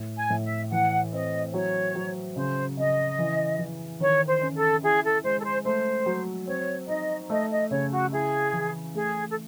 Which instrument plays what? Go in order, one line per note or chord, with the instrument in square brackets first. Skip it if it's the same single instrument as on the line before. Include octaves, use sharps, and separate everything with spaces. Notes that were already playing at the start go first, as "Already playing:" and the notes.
Already playing: [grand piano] A2
[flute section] G#5
[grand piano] A2
[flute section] E5
[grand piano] E3 [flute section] F#5
[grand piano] C4 [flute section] D#5
[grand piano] F#3 [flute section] C#5
[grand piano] F#3
[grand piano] C#3 [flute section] C5
[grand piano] C#3 [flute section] D#5
[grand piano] E3
E3
[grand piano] D#3 [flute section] C#5
[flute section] C5
[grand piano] C#4
[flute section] A4
[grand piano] E4 [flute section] G#4
[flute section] A4
[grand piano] G#3 [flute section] C5
[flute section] A4
C5
[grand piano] A3 [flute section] C5
[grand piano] F#3
[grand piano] C4 [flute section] C#5
[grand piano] D#4 [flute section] D#5
[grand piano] A3 [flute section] D#5
[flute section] D#5
[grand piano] C#3 [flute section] C#5
[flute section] F#4
[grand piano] E4 [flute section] G#4
[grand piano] E3
[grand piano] A3 [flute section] G#4
[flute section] A4